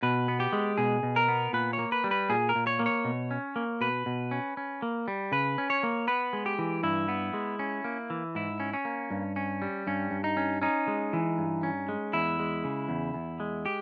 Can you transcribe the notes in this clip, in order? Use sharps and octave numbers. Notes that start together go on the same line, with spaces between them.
B2 B4
B3
G4
G#3
B2 G#4
B2
A#4
B3
A#2 B4
C#5
A#3
B4
G3
B4
A#2 G#4
A#4
A#2
C#5
A#3
C#5
B2
C#4
A#3
B2 B4
B2
C#4
C#4
A#3
G3
C#3 B4
C#4
C#5
A#3
B3 B4
G#3
G4
E3
G2 E4
B3
G#3
C#4
A#3
E3
G#2 E4
C#4
C#4
A#3
G2
C#4
G3
G2 C#4
G2
D#4
C#4
C#4 D#4
G#3
E3
G2
C#4
G#3
E2 E4
G#3
C#3
E2
E2
G#3
G4